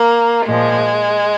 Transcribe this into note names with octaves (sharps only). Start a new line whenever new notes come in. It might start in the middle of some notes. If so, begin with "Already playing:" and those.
Already playing: A#3
A#2 F3 G#3